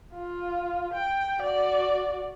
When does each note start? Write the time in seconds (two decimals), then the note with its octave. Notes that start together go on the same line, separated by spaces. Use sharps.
0.14 F4
0.93 G5
1.42 F#4 D5